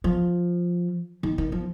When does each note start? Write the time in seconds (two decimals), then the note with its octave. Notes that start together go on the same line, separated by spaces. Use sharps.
0.04 F3
1.23 D#3
1.38 D#3
1.52 F3